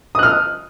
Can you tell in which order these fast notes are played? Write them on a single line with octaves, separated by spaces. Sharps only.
D#6 F#6 F6